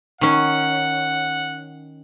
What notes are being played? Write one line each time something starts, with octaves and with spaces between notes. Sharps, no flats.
D#3 C#4 F#5